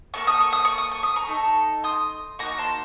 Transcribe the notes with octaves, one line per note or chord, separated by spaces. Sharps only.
A#3 D#4 A4 C#6
D#6
C#6
D#6
C#6
D#6
C#6
D#6
A#5 C#6
A3 D#4 A4
C6 D#6
A#3 D#4 F#4 A#5 C#6
A5 C6